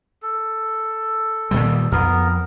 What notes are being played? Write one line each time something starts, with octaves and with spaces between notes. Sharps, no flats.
A4
A#2 D#3 G3
F2 B3 A#4